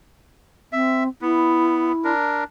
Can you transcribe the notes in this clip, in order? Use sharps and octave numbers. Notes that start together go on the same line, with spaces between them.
C4 E5
B3 E4
D4 A#4